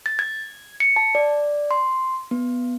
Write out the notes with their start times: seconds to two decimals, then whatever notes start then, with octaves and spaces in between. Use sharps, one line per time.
0.06 A6
0.19 G#6
0.80 C#7
0.96 A5
1.15 D5
1.71 C6
2.31 B3